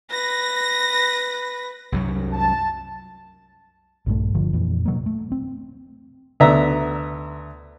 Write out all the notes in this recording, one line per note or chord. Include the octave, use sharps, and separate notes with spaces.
B4 A#6
C2 F#2 F#3
A5
A#1 G2 F3 A3
G1 D3 F3
F2 A#2 E3
B2 F#3 A#3
A3
C4
D2 B3 E5 A#5